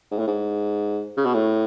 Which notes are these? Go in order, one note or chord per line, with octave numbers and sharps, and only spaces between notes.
G#2
A2
G#2
C#3
B2
A2